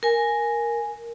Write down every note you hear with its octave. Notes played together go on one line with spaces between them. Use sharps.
A#4 G#5